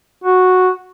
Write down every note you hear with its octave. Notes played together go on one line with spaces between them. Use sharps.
F#4